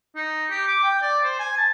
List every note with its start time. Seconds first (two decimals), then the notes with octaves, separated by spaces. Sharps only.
0.16 D#4
0.50 G4
0.68 D6
0.83 G5
1.02 D5
1.23 C5
1.39 G#5
1.57 A5